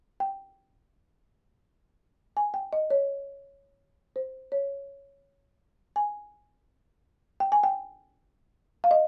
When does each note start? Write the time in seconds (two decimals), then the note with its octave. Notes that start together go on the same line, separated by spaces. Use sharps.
0.20 G5
2.37 G#5
2.54 G5
2.73 D#5
2.91 C#5
4.16 C5
4.52 C#5
5.96 G#5
7.40 G5
7.52 G#5
7.64 G5
8.84 F5
8.91 D#5